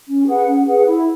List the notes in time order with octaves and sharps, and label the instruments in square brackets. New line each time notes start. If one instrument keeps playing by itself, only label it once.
[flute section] C#4
G#4 B4 F#5
C#4
G#4 B4 F#5
E4